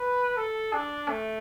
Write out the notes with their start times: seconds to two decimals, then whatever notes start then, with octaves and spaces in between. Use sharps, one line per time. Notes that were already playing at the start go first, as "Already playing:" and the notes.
Already playing: B4
0.37 A4
0.73 D4
1.09 A3